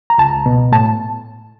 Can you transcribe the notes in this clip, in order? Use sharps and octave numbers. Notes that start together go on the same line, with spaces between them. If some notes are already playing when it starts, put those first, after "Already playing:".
A#5
C#2 A5
B2
A2 A5